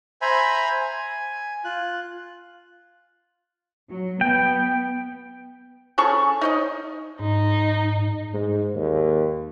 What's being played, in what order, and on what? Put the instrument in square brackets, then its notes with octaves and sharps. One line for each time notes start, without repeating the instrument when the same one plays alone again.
[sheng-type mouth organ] C5 E5 G#5 A#5 B5
G#5
F4 F#6
[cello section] F#3
[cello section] B3 [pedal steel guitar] G5
[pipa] C#4 G#4 A4 C#6
D#4 C#5 D#5
[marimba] G#2 [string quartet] D#4
[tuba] G#2
D#2